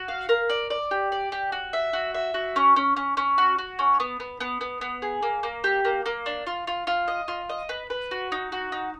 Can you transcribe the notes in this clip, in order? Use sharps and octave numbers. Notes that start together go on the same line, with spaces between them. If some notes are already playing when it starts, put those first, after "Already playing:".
Already playing: F#4
F5
A#4
D5
D5
G4
D5
G4
F#4
E5
F#4
E5
F#4
C#4
C#4
C#4
C#4
F#4
F#4
C#4
B3
B3
B3
B3
B3
G#4
A#3
A#3
G4
A#3
A#3
D4
F4
F4
F4
D#5
F4
D#5
B4
B4
F#4
D#4
F#4
D#4